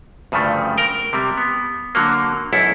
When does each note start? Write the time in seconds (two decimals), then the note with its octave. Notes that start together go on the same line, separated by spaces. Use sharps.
0.32 D2 G2 C#3 F3 A3
0.78 A#4 G5
1.13 C3 G3
1.37 B3
1.95 D3 F#3 A#3
2.53 B1 F#2 E4 A4